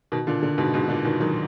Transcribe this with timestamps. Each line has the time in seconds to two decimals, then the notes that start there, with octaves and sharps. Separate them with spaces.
0.12 B2 D#3
0.27 A#2 D3
0.42 A#2 D3
0.58 G#2 B2
0.74 G#2 B2
0.89 A#2 D3
1.05 B2 D#3
1.20 D#3 F#3